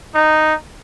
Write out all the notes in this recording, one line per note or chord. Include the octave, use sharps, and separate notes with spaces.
D#4